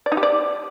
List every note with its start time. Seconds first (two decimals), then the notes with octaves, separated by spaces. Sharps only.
0.06 D5
0.12 D#4
0.17 G4
0.23 D5